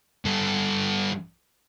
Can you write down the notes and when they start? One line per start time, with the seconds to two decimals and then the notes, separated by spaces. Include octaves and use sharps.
0.25 G2 A4